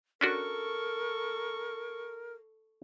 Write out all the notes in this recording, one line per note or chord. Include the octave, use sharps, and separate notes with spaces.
C#4 D4 F#4 A4 A#4 C#6